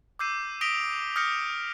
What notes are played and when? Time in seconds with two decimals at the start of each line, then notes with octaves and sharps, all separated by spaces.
0.19 D6 E6 G6 C7 D#7
0.61 D#6 A#6 B6 D7 F7 G7
1.16 D#6 F6 G6 A#6 C#7 F7